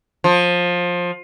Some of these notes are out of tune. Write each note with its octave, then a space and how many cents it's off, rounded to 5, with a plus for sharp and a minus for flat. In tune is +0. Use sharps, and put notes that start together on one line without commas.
F3 +20